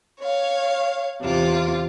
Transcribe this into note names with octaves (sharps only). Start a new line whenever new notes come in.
C#5 F5
E2 C3 F4 D6